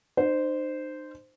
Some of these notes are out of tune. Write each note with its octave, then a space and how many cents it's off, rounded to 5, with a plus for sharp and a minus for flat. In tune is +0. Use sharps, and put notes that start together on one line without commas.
D#4 -40 C5 -10